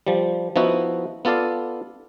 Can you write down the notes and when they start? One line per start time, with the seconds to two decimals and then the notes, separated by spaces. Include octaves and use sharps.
0.07 F3 G3
0.56 F3 B3 D#4 E4 F#4
1.25 B3 F4 A4 D5 F5